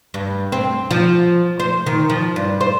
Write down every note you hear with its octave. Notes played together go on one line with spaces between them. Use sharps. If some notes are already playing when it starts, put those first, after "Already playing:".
G2
C4
F3
C5
D#3
F3
G2
C5